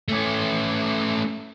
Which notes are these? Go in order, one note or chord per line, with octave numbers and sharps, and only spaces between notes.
A3 C#4